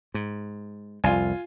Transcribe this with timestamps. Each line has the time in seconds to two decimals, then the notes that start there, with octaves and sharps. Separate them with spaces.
0.14 G#2
1.04 C2 F2 F4 G#5